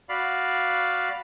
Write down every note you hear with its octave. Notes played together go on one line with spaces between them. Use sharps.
F#4 D5 F5 B5